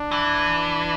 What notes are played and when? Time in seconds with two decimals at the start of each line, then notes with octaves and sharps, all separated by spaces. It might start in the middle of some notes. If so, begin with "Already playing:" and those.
Already playing: D4
0.12 E3